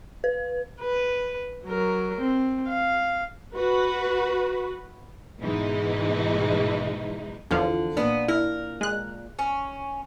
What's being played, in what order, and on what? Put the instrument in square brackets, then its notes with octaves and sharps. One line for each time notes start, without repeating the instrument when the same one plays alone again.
[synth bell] B4
[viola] B4
F#3 A#4
C4
F5
[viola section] F#4 B4
[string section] G#2 B2 E3 G#3 D#4 E4
[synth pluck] E2 F3 F5 [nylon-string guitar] D3
[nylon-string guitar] A#2 D4 [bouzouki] B3
[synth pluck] E4 [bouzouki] A#4
[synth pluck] G#3 F#6
[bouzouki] C#4